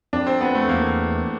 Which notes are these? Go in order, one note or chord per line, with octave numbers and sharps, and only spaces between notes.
F2 D4
C4
B3
A3
E2 A#3